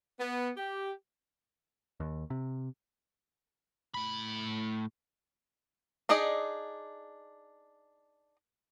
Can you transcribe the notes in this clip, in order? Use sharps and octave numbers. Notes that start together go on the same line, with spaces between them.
B3
G4
D#2
C3
A2 B5
D4 D#4 G#4 D5 D#5